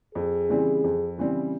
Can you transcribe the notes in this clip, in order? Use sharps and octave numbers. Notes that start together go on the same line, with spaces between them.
F2 G#4
C#3 E3 G3 C4
F2
C#3 E3 G3 C4